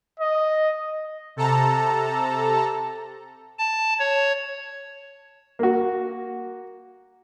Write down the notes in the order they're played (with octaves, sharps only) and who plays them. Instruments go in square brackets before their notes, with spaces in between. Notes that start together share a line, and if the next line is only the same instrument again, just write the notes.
[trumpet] D#5
[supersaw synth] C3 A4 A5 A#5
[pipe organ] A5
C#5
[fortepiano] A#3 F#4